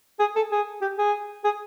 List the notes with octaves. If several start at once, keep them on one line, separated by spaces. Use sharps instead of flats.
G#4
A4
G#4
G4
G#4
G#4